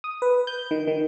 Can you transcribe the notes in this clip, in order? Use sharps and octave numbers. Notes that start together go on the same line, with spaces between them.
D#6
B4
G6
D#3
D#3